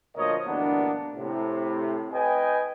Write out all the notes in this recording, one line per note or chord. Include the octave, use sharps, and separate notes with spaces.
D2 A#2 F3 A#4 C#5 D#5
D2 G2 E3 A#3 B3 D4
A2 C3
B4 D#5 G5 G#5